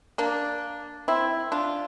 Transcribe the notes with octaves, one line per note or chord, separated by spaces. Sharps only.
A#3 D4
C4 E4
D4 F4